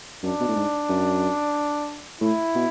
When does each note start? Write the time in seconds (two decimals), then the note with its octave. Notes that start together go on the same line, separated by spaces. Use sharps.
0.23 F#2 D4
0.40 B2
0.48 A2
0.56 G#2
0.89 F#2
2.21 A2 E4
2.55 B2